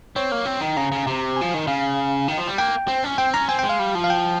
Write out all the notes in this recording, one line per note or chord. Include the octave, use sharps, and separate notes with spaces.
C4 C#5
A#3
C4
D#3
C#3 A#5
C#3
C3
F3 G#5
D#3
C#3 F5
D#3
F3
G3
A#3 G5
C4
C#4
C4 G5
C#4 A#5
C4 G#5
G5
G#3
F5
G3
F3
F5
G5